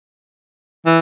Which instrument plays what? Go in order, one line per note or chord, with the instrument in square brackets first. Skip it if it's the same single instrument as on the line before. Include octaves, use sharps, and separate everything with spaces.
[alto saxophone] E3